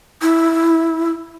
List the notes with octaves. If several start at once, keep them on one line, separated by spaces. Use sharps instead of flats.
E4